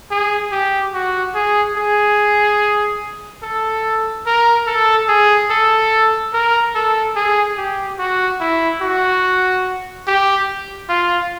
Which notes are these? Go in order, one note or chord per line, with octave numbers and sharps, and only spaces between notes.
G#4
G4
F#4
G#4
G#4
A4
A#4
A4
G#4
A4
A#4
A4
G#4
G4
F#4
E4
F#4
G4
F4